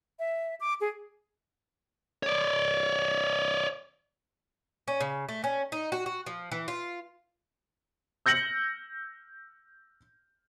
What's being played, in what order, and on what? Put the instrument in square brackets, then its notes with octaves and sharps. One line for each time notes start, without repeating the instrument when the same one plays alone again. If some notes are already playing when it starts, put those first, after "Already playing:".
[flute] E5
D6
G#4
[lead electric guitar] C#5 D5
[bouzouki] C#4
C#3
A3
C#4
D#4
F#4
F#4
F3
E3
F4
[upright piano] E6 G6 A#6 C#7 F#7